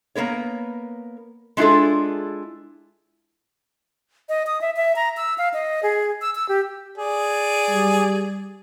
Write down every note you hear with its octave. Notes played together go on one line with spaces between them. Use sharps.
A#3 B3 A#4 C#5
G#3 D4 E4 F4 G#4 A4
D#5
D#6
E5
E5
A#5
E6
F5
D#5
G#4
E6
E6
G4
G#4 D5
G3